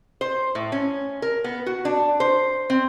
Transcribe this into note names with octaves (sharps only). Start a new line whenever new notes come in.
C5
A2
C#4
A#4
B3
F#4
D4
C5
C4